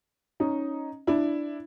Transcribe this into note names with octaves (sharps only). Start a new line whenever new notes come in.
C#4 D#4
D4 E4